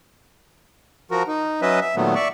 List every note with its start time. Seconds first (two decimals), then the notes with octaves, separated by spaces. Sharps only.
1.11 F3 F#4 A#4
1.27 D#4
1.62 F#3 C#4 B4 D#5 E5
1.81 E5
1.96 A#2 D#3 F#3 A3 B3
2.15 D5 E5 C#6